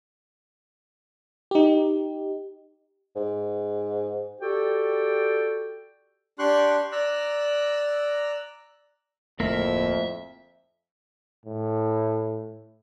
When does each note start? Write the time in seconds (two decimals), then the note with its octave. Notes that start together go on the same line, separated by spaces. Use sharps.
1.51 D#4 G4
3.16 G#2
4.41 F#4 G4 A4 D5 G5
6.39 D4 G4 C6 C#6 F#6
6.92 D5 A#5 E6 F#6
9.40 D1 F2 A3 A#3 E4 A#4 E5
11.45 A2